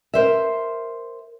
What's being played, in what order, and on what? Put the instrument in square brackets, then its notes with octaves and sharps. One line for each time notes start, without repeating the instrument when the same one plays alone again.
[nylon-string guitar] A#4 C5 E5